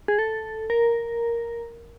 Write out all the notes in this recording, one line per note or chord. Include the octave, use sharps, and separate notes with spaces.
G#4
A4
A#4